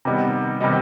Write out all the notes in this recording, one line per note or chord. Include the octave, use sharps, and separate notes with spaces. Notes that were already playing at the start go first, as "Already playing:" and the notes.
C3 D#3 G3 B3 D#4
C3 D#3 G3 B3 D#4